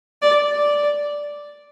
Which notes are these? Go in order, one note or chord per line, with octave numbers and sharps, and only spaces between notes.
D5
D5